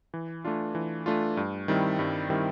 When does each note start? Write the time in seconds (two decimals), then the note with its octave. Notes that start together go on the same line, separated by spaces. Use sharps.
0.14 E3
0.45 A3 D4 F4
0.75 E3
1.06 A3 D4 F4
1.37 G2
1.68 D#3 G3 C4 E4
1.99 G2
2.30 D#3 G3 C4 E4